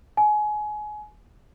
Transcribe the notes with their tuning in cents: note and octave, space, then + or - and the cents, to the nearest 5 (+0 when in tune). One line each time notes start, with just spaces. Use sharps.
G#5 +25